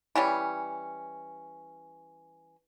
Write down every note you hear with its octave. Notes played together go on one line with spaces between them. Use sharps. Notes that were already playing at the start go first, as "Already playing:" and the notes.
E3 G3 C#4